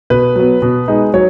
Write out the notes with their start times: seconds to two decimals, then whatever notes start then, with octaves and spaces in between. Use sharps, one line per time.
0.10 B2 B4
0.36 F#3 B3
0.62 B2
0.88 G#3 D#4
1.14 F#3 C#5